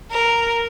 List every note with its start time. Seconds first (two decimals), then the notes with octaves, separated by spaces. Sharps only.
0.11 A#4